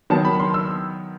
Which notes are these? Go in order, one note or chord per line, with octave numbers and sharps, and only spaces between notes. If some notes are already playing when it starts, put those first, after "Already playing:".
D#3 F#3 B3 A5
B5
C6
E6